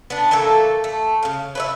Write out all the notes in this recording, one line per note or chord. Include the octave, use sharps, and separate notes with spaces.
B3 D4
E3 A3 A#3 A4
A3
C#3 F5
B4 C#5 E5